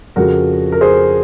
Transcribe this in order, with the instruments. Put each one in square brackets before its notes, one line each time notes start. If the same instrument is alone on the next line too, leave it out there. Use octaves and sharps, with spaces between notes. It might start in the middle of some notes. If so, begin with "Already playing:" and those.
[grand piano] F2 C#3 F3 F#4 A#4
A#4
G#4 C5